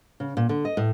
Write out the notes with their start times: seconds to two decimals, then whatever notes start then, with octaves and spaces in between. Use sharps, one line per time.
0.20 C#3
0.37 A#2
0.49 D3
0.65 D#5
0.77 A2